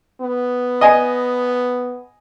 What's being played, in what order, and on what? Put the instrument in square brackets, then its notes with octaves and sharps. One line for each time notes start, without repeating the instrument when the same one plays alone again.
[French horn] B3
[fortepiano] D#5 G#5